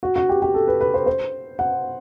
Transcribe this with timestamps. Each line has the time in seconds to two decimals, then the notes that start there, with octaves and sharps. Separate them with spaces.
0.03 F#4
0.16 F#4
0.29 G4
0.42 G4
0.54 A4
0.68 B4
0.81 B4
0.94 C5
1.06 C5
1.59 F#5